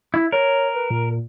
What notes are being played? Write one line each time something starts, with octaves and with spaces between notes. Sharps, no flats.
E4
A#4 C#5
B4
A#2